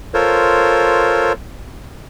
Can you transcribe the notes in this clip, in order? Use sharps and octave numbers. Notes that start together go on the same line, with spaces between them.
F4 A4 A#4 C5 C#5